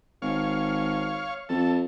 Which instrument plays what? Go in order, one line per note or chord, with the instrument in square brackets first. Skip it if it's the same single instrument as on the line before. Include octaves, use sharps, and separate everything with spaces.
[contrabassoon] G#1 [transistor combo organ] C#5 F5
[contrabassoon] F2 [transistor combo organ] A4